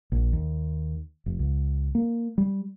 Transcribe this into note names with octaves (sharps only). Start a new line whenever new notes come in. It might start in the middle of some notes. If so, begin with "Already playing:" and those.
A#1
D#2
F1
C#2
A#3
G3